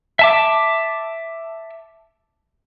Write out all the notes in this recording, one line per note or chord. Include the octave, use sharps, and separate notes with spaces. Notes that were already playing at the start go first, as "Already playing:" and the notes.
E5 A5 D6